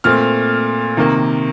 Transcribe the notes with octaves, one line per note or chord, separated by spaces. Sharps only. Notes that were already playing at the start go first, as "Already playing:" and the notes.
A#2 A3 C4 F6
C3 D#3 A#3